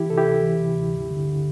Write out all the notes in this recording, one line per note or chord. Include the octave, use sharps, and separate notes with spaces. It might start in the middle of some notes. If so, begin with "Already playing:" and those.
Already playing: E3 E4 G4
C3 A4
E4 G4
D2
E3
C3
D2
G2
D3
D3